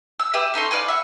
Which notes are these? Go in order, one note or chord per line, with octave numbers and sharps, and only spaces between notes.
E6
G4 G#4 B4 E5
C#4 D#4 A4 C6
G#4 B4 D5 F5
E5 F#5